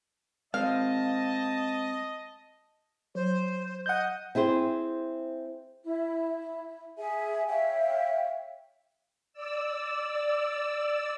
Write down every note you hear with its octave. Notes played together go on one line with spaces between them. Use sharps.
G#3 C4 D#5 F5 A5
F#3 C5
D#5 F#5 G6
C4 E4 G#4 C5
E4
G#4 E5 G#5
C#5 E5 F5 G5
D5 E6